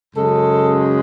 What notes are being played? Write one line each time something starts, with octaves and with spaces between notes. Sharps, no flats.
F#2 C#3 G#3 A4